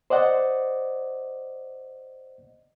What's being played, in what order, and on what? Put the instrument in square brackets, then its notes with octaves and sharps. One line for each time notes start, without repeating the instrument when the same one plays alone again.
[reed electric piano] C5 D5 D#5 F#5